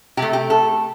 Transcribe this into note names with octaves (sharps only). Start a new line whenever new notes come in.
C3 A3 G4
G4
A4